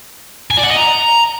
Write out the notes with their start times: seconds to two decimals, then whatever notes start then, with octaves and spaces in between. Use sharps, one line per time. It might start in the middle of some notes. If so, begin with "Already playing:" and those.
0.51 G#5
0.57 D5
0.64 F#5
0.70 D#5
0.76 A#5